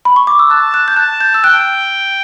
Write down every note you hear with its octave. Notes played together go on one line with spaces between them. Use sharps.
B5
C#6
D6
E6
A5 F#6
F#6
G6
A5 F#6
G6
E6
G5 F#6